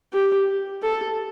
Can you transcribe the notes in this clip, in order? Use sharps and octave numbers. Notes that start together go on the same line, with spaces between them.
G4
A4